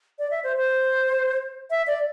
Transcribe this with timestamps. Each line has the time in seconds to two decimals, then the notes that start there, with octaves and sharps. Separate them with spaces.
0.19 D5
0.31 E5
0.44 C5
0.57 C5
1.70 E5
1.87 D5